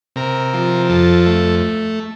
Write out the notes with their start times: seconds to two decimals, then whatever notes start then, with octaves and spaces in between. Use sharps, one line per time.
0.16 C3 A#4
0.54 F3
0.89 F2 A4
1.26 A3